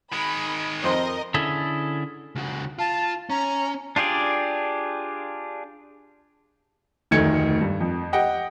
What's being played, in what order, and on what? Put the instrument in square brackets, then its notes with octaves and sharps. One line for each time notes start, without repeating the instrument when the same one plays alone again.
[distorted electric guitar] D#3 G#3 [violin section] B5
[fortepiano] F2 C5 C6 [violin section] A#4 D#5
[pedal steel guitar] D3 C#4 E4 G#4 A4
[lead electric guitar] C#2 F#4
[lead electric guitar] F4 [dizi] A5
[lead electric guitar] C#4 [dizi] A#5
[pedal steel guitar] D4 F4 G4 G#4 D5
[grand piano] F1 D2 D#3 A3 G#6 C#7
G2
F2
G4 D#5 F#5 G5